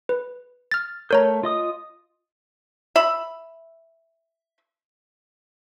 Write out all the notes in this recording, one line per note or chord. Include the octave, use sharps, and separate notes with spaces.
B4
F6 A6
A3 A#4 C#5 A#5 G6
F4 D#5 D#6
E5 B5